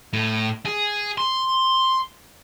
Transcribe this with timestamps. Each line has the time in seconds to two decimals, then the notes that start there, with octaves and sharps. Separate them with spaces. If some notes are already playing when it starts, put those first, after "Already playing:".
0.13 A2
0.65 G#4
1.18 C6